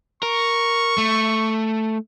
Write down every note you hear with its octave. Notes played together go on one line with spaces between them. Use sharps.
A#4 C#6
A3